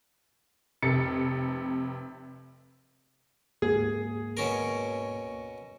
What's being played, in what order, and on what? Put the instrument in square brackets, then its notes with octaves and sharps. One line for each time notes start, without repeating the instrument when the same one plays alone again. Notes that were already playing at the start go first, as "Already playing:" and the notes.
[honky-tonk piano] F1 C3 A6 C#7
[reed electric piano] D2 G#2 A#3 [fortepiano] G#4
[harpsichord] B2 C#4 A#4